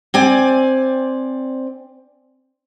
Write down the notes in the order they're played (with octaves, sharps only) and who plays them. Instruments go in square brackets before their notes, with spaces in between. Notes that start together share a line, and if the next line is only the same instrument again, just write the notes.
[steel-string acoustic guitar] C4 D5 G#5